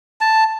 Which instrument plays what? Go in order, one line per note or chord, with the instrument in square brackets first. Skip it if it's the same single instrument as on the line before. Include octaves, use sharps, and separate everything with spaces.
[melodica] A5